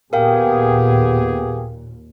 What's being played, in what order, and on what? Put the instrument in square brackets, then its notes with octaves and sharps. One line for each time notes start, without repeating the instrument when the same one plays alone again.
[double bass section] D#2 A#2 [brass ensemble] B3 G4 G#4 [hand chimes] A#4 F5 G5